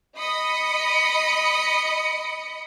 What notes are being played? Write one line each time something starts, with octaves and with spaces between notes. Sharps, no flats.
D#5 B5 D#6 C#7